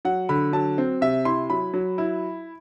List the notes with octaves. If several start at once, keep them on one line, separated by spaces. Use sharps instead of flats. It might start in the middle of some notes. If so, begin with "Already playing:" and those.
F#3 F#5
D3 B5
F#3 A5
C4
C3 E5
E4 C6
F#3 B5
F#3
E4